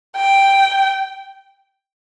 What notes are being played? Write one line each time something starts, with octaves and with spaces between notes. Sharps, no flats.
G5